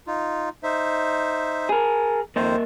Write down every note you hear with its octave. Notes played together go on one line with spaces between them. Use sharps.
D#4 F4
D#4 C5 E5
G#4 A#4
F2 D#3 A#3 C5 D#5 E5